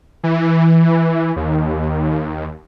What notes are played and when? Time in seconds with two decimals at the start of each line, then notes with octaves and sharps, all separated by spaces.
0.23 E3
1.36 D#2